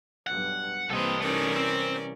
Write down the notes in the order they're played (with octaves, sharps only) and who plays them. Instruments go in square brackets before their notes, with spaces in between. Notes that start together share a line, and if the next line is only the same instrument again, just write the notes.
[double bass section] B1 G2 [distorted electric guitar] F#5
[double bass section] C2 E3 [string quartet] A#3 C4 B4 [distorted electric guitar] A4 D#5
[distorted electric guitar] A3 D#4 [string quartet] C#4 A#4 D5
[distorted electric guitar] C4